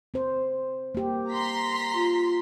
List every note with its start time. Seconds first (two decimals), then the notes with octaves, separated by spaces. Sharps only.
0.14 C4 C5
0.95 A#3 G4
1.30 A#5 C6 B6
1.94 F4